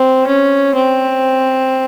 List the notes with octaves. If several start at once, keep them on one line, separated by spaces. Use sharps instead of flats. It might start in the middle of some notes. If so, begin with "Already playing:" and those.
Already playing: C4
C#4
C4